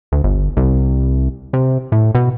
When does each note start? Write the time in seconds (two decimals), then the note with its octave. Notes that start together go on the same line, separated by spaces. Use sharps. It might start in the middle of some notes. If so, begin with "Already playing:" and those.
0.12 D2
0.24 G1
0.57 C2
1.53 C3
1.92 A2
2.15 B2